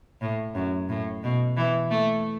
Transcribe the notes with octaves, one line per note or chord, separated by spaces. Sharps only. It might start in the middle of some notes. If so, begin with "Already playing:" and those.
A2
F#2
A2
B2
E3
A3